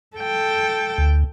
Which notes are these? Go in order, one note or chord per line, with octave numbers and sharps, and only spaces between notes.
A4 G5
D2